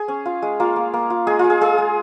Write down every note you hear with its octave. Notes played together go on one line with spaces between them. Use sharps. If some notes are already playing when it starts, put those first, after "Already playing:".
Already playing: G#4
C#4
F4
G#3
A#3 F4
A#3
A#3
F4
G#3 G#4
G#3 F4
G#4
G#3 G#4
G#3